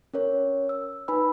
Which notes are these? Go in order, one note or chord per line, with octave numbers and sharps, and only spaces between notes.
C#4 A#4 C#5
E6
D#4 B4 G#5 B5 E6